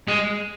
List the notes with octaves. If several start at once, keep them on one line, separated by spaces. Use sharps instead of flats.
G#3